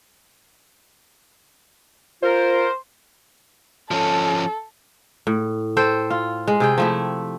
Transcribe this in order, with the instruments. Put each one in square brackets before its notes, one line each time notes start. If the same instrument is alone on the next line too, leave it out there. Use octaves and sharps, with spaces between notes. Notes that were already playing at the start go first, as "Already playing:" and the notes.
[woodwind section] F4 A#4 [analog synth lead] C5
[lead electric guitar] F3 C#4 [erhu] A4
[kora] A2
A4 C5 G5
F4
G#3
C3 G#4 G5
F3 A3 E4